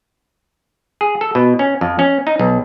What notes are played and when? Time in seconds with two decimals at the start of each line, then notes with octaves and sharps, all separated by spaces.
1.01 G#4
1.21 A4
1.35 B2
1.59 C#4
1.81 F2
1.99 C#4
2.27 D#4
2.40 B1